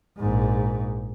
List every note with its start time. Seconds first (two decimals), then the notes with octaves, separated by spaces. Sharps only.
0.17 A#1 G#2